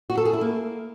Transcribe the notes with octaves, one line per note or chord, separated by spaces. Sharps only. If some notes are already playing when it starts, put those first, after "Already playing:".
F#4
A4
G#4
E4
A#3